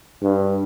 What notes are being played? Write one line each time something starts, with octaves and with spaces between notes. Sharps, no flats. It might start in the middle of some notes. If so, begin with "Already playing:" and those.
G2